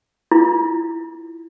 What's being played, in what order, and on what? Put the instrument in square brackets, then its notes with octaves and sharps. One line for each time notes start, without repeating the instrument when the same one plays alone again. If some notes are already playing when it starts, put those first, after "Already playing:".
[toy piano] E4 F4